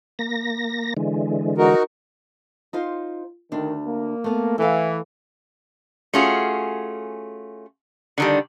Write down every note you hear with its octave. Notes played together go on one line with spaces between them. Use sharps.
A#3 A#6
D3 E3 G#3
D#4 F#4 A#4
D#4 F4 C5
D2 D#3 D4
A#3
A3 B3
E3 A4 F5
A3 C#4 F4 F#4 G#4
D3 D#3 G3